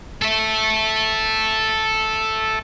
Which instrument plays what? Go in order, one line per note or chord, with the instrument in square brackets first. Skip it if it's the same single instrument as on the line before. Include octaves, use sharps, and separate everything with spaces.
[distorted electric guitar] A4 E5